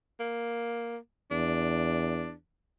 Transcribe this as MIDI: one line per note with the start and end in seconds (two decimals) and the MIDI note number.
0.20 0.97 58
1.31 2.32 40
1.31 2.34 62